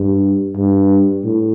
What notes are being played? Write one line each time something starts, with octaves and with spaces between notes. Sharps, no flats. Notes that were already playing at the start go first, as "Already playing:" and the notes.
Already playing: G2
G2
A2